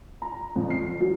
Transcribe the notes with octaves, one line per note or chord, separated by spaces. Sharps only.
A#5
F2
C7
F#3